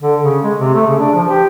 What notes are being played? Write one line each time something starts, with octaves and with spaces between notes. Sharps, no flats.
D3
C#3
G#3
C3
A3
C#3
D4
F3
G4